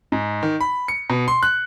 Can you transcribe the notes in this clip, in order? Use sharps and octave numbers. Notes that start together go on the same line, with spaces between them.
G#2
D#3
B5
C#7
B2
C6
F#6